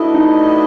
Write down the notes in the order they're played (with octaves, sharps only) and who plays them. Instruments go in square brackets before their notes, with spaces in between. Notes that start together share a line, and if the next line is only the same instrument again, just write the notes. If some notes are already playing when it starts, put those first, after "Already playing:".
Already playing: [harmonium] A3 D4 F#4 B4 D#5 [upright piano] E4
[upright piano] D#4